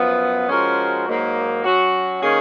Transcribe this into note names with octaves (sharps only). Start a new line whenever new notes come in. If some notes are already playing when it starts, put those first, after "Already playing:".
Already playing: F#2 F3 B3
F3 G#3 C#4 F#4 A#4
G#2 F#3 A#3 D#4
F#3 C#4 F#4
D#3 A#3 C#4 G#4